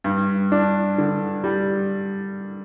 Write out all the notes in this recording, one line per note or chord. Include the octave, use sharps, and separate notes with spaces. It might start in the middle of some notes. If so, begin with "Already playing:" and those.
G2
D4
D3
G3